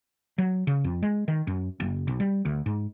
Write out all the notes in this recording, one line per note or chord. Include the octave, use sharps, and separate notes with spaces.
F#3
C#3
F2
G#3
D#3
F#2
F#1
B1
G3
D2
G#2